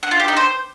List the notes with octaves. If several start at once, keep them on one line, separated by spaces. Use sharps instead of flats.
F#5
F4
G4
D#4
C5